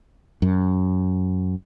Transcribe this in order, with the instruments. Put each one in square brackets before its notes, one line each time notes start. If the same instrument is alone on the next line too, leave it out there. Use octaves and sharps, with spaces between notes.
[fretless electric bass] F#2